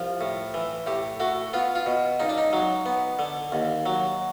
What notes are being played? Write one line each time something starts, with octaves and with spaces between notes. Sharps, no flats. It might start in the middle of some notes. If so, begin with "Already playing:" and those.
Already playing: C2 F3
A2
E3
A2 G4
A3 F#4
B3 F4
F4
B2
C#2 D#4
D4
D#4
F#3
B3
D3
D#2
F#3